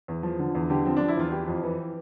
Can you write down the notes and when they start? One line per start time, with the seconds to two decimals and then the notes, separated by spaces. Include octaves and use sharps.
0.08 E2
0.23 F3
0.39 D3
0.55 E2
0.70 D3 G4
0.85 F3 C4
0.97 F3 D4
1.08 E4
1.17 E2 F4
1.32 E3 G4
1.48 F2
1.63 E3